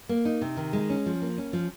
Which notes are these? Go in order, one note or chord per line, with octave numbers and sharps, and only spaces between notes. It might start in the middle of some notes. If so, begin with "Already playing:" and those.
A#3
D#4
C3
D#3
G#3
C#4
F3
A#3
C#4
F3